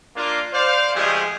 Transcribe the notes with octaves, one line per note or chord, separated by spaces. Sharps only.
A#3 D4 F4
C5 D5 F5
C#3 F3 G#3 A3 G4 G#4